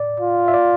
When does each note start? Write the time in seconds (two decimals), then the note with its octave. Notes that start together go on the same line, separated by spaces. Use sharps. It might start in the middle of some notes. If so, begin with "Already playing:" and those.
Already playing: D5
0.20 F4
0.48 E5
0.54 D5